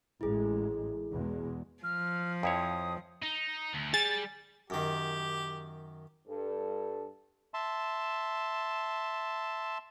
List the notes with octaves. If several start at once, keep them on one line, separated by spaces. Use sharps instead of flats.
A1 G#3 E4 G#4
E2 B2 G#3
F3 F6
F2 E4 C#5 D#6
D#4
D2
G3 G#4 A6
F#2 D#3 G4
G2 A4
E5 A5 C6